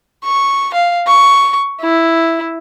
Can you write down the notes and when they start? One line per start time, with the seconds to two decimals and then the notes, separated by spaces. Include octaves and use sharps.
0.24 C#6
0.74 F5
1.07 C#6
1.81 E4